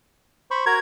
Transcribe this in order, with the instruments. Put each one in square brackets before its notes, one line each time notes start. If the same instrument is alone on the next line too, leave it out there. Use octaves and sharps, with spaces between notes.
[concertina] C5 B5 C#6
[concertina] F#4 A#4 A#5 [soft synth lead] G#6